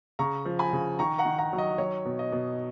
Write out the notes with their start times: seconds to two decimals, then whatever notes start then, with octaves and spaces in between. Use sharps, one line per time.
0.19 C#3 A#5 C#6
0.46 F3
0.59 G#5 B5
0.73 C#3
0.99 D#3 A#5 C#6
1.18 F#5 A#5
1.25 D#3
1.38 F#5 A#5
1.53 F#3
1.58 D#5
1.78 F#3 C#5
2.05 B2
2.19 D#5
2.32 B2